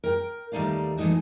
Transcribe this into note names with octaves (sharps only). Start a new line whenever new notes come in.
A#4 G5
D#2 G3 A3 D#4 D5 F5
E3 G#3 A3 D#4 F#4